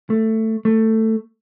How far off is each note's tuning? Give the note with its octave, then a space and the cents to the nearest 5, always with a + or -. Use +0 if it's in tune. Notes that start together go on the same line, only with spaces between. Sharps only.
A3 +10
A3 +15